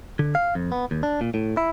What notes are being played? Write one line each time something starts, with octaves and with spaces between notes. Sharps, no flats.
D3
F5
F2
B3
D#2
D4
A#2
A2
E4